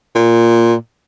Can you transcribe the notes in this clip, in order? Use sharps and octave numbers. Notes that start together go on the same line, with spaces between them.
A#2